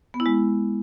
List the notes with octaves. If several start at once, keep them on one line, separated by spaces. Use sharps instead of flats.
B3
E4
G#3